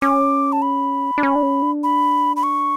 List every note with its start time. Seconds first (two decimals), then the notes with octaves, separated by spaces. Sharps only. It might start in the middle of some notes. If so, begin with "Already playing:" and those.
0.02 C#4 D6
0.52 A5
0.62 B5
1.18 D4
1.23 C#4
1.36 D4
1.43 C#4
1.62 D4
1.83 B5
2.36 B5
2.43 C#6